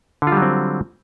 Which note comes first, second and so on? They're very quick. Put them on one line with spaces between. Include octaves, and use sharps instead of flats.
D3 F4 G3 F#3 C4